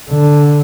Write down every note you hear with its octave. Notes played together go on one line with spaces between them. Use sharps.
D3